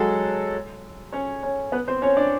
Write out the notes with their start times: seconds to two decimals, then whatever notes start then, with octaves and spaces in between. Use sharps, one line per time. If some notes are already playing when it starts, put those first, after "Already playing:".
Already playing: F#3 G#3 F#4 G#4 A4
1.13 C#4 C#5
1.43 C#4 C#5
1.72 B3 B4
1.88 C4 C5
2.02 C#4 C#5
2.17 D4 D5